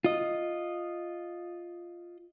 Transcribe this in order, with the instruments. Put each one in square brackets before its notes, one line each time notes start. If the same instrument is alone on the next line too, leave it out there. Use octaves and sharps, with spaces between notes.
[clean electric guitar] F4 D#5